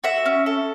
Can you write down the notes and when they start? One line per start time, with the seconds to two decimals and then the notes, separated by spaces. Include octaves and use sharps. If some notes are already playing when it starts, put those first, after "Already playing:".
0.04 F#4 E5
0.26 C#4
0.46 A4